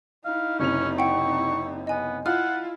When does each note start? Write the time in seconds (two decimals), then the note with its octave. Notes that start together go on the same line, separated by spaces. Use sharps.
0.25 D#4 E4 F5
0.59 F#1 C3 C#4 F7
0.98 F#5 G5 C#6
1.87 B3 D#5 G#5
2.26 E4 F4 F#5 F6